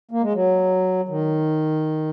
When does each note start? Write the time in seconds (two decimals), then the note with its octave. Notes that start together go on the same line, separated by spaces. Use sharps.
0.11 A#3
0.22 G#3
0.33 F#3
1.09 D#3